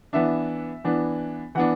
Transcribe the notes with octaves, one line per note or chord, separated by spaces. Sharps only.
E3 B3 D4 E5
E3 B3 D4
E3 B3 D4 F#5